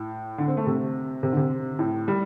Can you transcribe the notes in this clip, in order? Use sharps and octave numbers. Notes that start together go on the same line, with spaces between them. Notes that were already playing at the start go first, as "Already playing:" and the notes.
Already playing: A2
D3
C4
A3
C3
C3
D3
C3
A2
G3